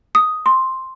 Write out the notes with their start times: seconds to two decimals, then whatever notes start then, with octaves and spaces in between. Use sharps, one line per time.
0.15 D#6
0.46 C6